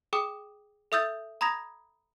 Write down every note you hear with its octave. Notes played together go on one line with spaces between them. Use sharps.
G#4 G5 D6 D#6
A4 E5 D#6 E6 G6 A6
A#5 B5 D#6 G#6 A#6